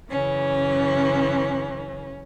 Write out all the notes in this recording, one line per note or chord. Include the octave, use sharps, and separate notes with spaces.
F#2 C#3 E3 C#4